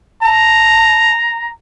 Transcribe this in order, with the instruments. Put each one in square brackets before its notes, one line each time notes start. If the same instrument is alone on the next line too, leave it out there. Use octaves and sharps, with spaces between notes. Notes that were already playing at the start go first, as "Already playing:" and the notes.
[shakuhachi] A5 [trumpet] A#5